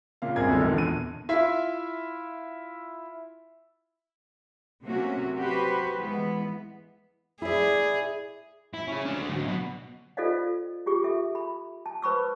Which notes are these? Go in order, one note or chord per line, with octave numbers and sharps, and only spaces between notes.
A#2 C#3 A#3 F5
C2 F#2 C3 C4 G#4 G#6
D3 G#3 A#3 D#4 A4 A#4
A#1 E2 D3
B2 D#7
E4 F4 E5
C3 F#3 A3 A#3 C#4 F#4
F#4 G4 B4 C5
E3 G#3 B3
E4 G#4 D5
E4
C#4 G#4
A3 D4
D3 F#3
B2
F4 A4 C5 D5 D#5 F5
F4 G4 G#4 C#6
A4 E5
B5
A5
B4 C5 B5 C#6 E6